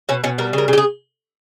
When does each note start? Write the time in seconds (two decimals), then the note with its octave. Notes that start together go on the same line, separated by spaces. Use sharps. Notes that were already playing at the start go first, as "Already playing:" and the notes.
0.09 B2 C#4
0.24 B2 C#4
0.38 G3 A#4
0.53 C#3 A#4
0.68 C#3 G4
0.78 G#4